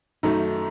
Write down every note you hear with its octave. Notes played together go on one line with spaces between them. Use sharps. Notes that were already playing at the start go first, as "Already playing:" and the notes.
F#2 D#3 F#3 A3 D#4